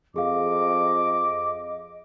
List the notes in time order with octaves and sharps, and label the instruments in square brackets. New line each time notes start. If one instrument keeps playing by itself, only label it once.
[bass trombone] F2 [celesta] G#4 F5 [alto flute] D#5 [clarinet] D6